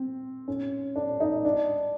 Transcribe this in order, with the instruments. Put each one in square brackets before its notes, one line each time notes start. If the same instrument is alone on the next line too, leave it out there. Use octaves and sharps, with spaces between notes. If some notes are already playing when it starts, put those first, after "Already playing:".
Already playing: [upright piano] C4
C#4
D4
D#4
D4